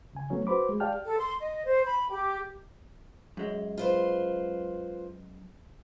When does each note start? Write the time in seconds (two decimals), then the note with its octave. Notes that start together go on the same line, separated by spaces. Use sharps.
0.13 D2 C#3 G#5
0.30 F#3 A3 B3 C#4 C#5
0.47 F#4 B4 C5 B5 D6
0.69 G#3
0.80 G4 D5 F5 G5 A5 F6
1.04 A4
1.19 C6
1.40 D#5
1.65 C5
1.84 B5
2.08 G4
3.37 F#2 G#3
3.78 F4 B4 C5